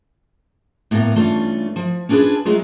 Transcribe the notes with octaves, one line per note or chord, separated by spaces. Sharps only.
A2 A#3 B3 F#5 A#5
G2 E3 A3 C#4 F4
F3
C#4 D4 F4 G#4 B4 A5
F#3 G#3 A3 F4 G#4